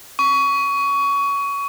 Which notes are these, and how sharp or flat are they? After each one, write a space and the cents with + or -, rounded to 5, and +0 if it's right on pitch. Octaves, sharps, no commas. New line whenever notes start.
C#6 +20